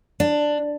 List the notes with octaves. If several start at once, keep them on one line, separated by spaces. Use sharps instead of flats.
D4